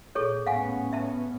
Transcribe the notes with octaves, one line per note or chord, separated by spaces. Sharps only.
A#2 G#4 A4 C#5
A2 B3 C#4 F5 F#5 G#5
E5 A5